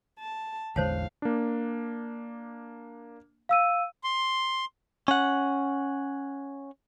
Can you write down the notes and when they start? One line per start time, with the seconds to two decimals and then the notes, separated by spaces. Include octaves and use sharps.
0.19 A5
0.76 A1 E2 D3 G#3 C5 C#5 F5 A5
1.22 A#3 D4
3.49 F5 E6 D#7
4.04 C6
5.08 C#4 F#5